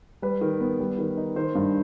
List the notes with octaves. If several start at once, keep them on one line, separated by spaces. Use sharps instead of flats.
G3 B4
D#3
B3
G3
D#3
D#4
D#3 C5
G2